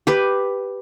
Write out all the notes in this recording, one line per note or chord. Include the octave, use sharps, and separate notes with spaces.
G4 B4